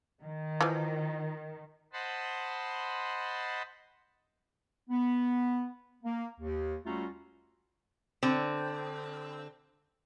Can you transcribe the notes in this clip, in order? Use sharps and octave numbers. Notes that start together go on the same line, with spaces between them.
D#3
E3 F3
C5 D#5 F#5 A5 B5 C6
B3
A#3
D#2
G3 A3 C#4 F4 F#4 A#5
D3 C4